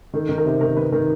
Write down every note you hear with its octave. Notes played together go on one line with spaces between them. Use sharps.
D#3 A4
D#3
A#4
C3
D#3 A#4
D#3 B4
D#3 A#4